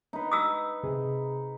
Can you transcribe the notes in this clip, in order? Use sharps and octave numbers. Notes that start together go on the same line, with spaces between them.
D#4 B4
D#6 E6
C3 G#4